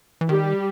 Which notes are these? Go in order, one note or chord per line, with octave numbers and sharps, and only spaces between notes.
E3
D#3 G3 G4